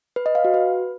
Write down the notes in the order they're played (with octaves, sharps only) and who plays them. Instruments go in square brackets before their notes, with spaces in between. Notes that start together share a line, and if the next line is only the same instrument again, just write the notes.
[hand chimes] B4
D#5
F5
F#4
B4